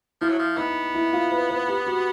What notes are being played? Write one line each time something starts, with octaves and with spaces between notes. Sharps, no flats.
F3 E4
F#3
F3
B3 D#4
E4
F4
B4
B4
G4
F#4